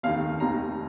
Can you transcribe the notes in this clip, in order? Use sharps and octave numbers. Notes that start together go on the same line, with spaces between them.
F1 D#2 D#3 F5
F1 D#2 D#3 A#5